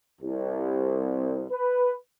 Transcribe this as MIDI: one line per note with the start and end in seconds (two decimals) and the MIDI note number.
0.22 1.45 36
1.51 1.93 71